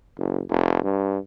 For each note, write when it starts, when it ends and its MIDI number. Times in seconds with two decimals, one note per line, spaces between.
0.18 0.41 30
0.49 0.82 29
0.84 1.18 43